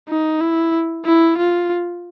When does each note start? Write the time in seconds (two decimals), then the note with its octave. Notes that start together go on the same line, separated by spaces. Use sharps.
0.08 D#4
0.40 E4
1.05 E4
1.38 F4